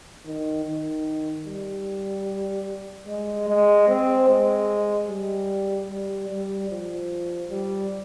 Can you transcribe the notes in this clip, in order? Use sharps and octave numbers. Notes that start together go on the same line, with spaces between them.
D#3
D#3
G3
G#3
G#3
C4
G#3
G3
G3
G3
F3
G3